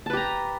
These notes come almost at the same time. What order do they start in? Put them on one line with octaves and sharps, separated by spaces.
A5 B4 G4 A#5